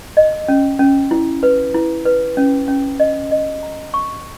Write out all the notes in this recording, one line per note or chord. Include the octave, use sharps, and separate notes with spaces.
D#5
C#4
C#4
E4
B4
E4
B4
C#4
C#4
D#5
D#5
A#5
C#6